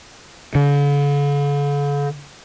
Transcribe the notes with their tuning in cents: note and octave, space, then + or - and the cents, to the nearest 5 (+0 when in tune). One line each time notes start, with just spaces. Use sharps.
D3 -45